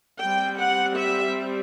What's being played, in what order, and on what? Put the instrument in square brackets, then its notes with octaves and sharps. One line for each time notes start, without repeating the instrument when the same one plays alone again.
[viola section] G3 C4 G5
F#5
E5